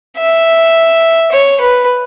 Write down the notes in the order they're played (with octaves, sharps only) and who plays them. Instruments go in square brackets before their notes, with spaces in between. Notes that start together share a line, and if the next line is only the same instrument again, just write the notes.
[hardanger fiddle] E5
C#5
B4